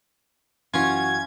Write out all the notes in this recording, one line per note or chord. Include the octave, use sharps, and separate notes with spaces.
F#2 E3 C#4 F4 F#4 G#6